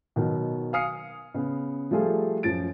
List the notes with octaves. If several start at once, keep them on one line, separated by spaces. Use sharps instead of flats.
B2 D#3 F#3
F5 G#5 D#6 F6 C7 C#7
C#3 B3
F3 G3 A3 F4 G#4 A4
F#2 F3 A6 D7